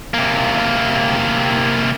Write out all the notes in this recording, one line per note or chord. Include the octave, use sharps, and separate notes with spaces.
C3 A#3